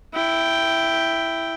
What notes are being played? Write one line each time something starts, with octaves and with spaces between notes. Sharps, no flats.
E4 G5